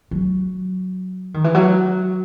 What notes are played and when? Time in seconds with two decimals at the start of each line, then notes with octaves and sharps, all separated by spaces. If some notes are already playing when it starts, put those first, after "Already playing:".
0.11 F#3
1.34 D#3
1.44 E3
1.55 F#3